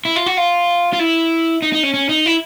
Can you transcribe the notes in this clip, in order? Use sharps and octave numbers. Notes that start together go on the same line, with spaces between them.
E4
F4
F#4
F4
F4
E4
D#4
D#4
C#4
C#4
D#4
E4